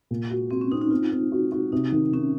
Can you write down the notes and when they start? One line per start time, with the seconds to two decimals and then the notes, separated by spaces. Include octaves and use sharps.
0.11 A#2
0.30 F#4
0.51 C4 F#4
0.61 C#4
0.71 C4 D#4
0.81 D#4
0.91 C4 F4
1.12 C4
1.32 F#4
1.52 F#4
1.72 C3 D#4
1.92 D#3
2.13 D#3 C#4